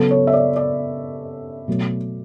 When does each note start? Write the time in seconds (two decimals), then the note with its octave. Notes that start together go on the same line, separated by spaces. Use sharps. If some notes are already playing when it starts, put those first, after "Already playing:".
Already playing: C#3 F#3 B3 A4
0.11 C#5
0.27 E5
0.33 D5
0.56 D5
1.68 B2 F#3 A3